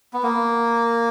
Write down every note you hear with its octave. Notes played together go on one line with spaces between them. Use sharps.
B3
A#3